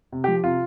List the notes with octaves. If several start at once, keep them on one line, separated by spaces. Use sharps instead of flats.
C3
F3 G4
C3 F4